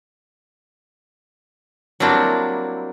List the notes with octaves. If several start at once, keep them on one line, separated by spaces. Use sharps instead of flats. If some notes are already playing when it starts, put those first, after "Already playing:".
F#3 G3 A#3 C4 D4 E4